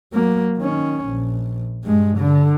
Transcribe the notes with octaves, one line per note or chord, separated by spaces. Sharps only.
F#3 A#3
D#3 C#4
A#1
G2 G#3
D3